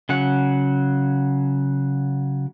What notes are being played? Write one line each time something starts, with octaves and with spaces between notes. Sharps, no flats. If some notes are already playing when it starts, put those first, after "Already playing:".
C#3 F#3 F#5